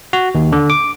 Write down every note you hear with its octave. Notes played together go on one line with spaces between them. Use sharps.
F#4
D#2
D3
D6